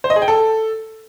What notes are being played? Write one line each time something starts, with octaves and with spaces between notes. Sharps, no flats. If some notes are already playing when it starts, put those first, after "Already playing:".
C5
D#5
G#4
G5
A4